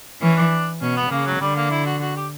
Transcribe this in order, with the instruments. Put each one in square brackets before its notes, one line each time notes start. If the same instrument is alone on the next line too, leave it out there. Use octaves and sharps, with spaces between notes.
[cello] E3 [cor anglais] C#4
[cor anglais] D4
[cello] B2 [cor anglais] C#4
[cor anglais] B3
[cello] C#3 [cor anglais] A#3
[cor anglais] F#3
[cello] D3 [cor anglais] G3
[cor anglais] A#3
E4
F#4
F#4
G4